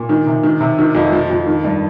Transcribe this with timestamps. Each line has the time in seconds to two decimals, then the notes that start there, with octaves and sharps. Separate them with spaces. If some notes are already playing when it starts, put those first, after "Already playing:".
Already playing: A#2
0.09 D#3
0.27 C3
0.43 D#3
0.61 C3
0.79 D#3
0.95 F2
1.12 F3
1.30 F2
1.47 D#3
1.64 G2